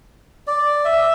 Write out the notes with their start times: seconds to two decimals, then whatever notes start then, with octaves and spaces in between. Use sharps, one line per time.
0.47 D5
0.85 E5